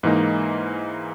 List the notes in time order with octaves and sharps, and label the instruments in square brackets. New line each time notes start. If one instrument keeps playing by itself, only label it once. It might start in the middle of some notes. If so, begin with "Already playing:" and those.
[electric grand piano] G#2 E3 A#3 D#4